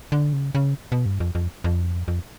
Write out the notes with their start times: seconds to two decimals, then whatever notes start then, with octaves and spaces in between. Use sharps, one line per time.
0.12 D3
0.33 C#3
0.55 C#3
0.92 B2
1.06 G2
1.20 F2
1.35 F2
1.64 F2
2.08 F2